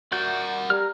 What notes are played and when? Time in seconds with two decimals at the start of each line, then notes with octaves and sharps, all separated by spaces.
0.12 F#4 A#4 D5 F#5 G6
0.70 G3 A#5 F6